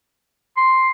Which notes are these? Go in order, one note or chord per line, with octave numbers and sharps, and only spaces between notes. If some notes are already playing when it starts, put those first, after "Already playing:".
C6